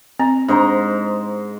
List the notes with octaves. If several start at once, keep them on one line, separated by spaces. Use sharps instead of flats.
C4 A#5
G#2 D4 C5 A#5